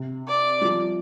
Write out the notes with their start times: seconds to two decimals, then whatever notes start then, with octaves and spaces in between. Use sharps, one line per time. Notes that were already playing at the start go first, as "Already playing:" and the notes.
Already playing: C3
0.28 D5
0.61 G3
0.65 F3